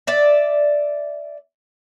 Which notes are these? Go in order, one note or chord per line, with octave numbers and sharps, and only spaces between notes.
D5 E5